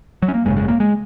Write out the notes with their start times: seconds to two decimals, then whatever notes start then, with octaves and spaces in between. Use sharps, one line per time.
0.22 F#3
0.28 C#4
0.34 A#3
0.45 G#1 F#2 C#3 G#3
0.57 G#3
0.68 A#3
0.80 G#3